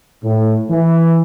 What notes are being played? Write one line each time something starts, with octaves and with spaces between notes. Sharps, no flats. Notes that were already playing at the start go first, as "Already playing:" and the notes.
A2
E3